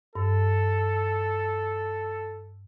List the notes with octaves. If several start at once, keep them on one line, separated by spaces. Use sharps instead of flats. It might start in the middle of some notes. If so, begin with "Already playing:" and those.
G2 A4